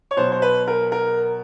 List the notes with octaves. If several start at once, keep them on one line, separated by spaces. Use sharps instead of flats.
C#5
B2 F#3 C5
C5
B4
A#4
A#4